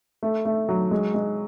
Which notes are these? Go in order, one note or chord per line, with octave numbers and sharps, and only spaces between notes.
A3
A3
F#3
G#3
G#3